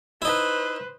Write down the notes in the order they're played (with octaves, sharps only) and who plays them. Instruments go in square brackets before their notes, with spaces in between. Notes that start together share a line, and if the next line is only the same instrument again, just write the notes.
[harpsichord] D#4 E4 [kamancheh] B4 C5